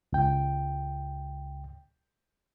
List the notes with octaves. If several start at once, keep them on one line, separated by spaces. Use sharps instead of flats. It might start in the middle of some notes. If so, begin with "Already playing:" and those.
C#2 G5